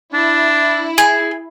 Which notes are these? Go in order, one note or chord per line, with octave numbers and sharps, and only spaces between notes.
D4 E4
G#4